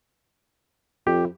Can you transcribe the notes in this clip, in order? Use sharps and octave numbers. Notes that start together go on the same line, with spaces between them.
F2 G4